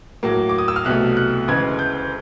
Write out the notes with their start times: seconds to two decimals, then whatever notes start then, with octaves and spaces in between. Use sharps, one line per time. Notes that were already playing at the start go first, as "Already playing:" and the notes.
0.23 A2 F#3 A#3
0.49 D6
0.58 D#6
0.68 E6
0.76 F6
0.85 C2 B2 F#3 A3 F#6
1.17 F#6
1.48 D2 C#3 E3 G#3 G#6
1.79 G6